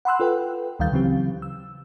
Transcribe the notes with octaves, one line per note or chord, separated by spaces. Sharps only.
F#5 B5 C6 E6 F#6
F4 A4 B4 G5
D2 D#3 G3 F5 G6 A6
C#3 E3 F#3 C4 G4
E6